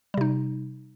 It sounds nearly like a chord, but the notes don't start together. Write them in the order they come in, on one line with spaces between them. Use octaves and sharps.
G3 C3 D#4